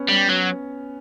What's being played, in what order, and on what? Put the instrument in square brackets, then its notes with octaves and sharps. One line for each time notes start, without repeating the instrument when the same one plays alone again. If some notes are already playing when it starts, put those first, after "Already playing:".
Already playing: [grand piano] B3 C#4
[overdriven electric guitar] G3
F#3